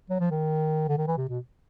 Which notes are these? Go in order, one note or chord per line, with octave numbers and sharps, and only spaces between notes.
F#3
F3
D#3
D3
D#3
E3
C3
B2